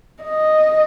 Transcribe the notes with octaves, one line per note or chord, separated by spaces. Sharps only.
D#5